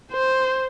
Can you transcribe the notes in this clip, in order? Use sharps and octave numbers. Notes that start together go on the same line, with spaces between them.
C5